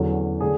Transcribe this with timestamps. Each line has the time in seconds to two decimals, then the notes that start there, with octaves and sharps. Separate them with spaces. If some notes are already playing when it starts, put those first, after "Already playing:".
Already playing: E2 D3 F#3 C#4
0.40 D3 A3 D4 G#4